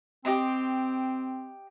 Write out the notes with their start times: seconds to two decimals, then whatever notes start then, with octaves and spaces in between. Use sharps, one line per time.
0.25 C4 G4 D#5 C6